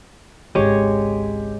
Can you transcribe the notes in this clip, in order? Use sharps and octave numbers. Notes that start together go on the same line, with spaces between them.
G#1 C#2 G#3 G4 C#5